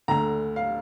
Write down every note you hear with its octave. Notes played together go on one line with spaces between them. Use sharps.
D2 D3 A#5
F5